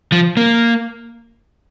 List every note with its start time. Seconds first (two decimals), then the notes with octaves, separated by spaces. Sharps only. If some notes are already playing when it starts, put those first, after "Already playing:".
0.12 F3
0.37 A#3